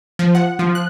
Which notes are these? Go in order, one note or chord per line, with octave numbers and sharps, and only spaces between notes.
F3
F#5
F3
F#6